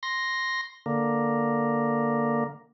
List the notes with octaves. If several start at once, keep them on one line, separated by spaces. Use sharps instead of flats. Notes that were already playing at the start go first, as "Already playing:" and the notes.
C6 A#6
D3 A#3